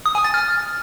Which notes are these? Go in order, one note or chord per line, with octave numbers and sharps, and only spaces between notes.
D#6
G#5
A6
F6